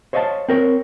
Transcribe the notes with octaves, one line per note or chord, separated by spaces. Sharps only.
C5 C#5 D#5 F5 F#5 A5
C4 A#4 C#5